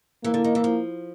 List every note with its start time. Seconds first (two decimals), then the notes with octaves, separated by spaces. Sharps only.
0.24 E3 A#3
0.34 D3
0.44 D#3
0.55 E3
0.64 F3